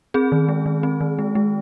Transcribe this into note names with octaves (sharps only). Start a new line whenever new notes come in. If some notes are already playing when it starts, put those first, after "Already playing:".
C4 G#4
D#3
G#3
D#3
C4
D#3
G#3
G#3